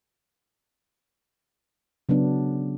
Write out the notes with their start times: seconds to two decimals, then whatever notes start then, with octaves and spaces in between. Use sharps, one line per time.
2.09 C#3 F#3 B3 D4